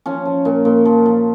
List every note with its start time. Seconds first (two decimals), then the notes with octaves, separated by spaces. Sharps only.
0.06 F3 C#4
0.25 F3
0.45 A#2
0.65 A#2
0.85 F3
1.06 F3